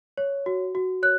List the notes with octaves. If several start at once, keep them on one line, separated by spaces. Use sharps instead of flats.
C#5
F#4
F#4
C#5 F#6